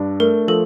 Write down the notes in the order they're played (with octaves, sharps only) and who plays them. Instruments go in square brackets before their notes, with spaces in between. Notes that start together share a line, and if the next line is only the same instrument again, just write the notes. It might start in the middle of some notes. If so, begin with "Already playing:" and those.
Already playing: [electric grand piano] G2 D4
[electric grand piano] A3 [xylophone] A#4
[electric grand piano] F3 [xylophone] A4